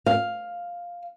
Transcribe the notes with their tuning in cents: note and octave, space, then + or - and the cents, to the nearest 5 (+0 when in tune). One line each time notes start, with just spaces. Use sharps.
F5 +5